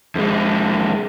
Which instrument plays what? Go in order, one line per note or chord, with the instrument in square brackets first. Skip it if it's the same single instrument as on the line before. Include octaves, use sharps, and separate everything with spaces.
[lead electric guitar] F2 G#3